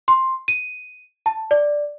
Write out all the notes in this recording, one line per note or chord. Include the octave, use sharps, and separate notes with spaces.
C6
D#7
A5
D5